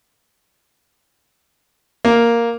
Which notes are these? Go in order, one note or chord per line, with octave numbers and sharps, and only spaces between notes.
A#3